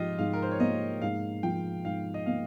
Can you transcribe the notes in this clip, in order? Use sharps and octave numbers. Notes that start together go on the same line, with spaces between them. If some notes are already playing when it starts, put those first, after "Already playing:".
Already playing: G#2 F3 F4 G4 D#5
G#2 F5
A#4
C5
C#5
A#3 D#5
G#2 F5
F3 G5
G#2 F5
D#5
A#3 F5